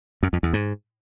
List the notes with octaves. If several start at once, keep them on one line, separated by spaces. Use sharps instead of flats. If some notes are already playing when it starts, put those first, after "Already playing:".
F#2
F2
E2
G#2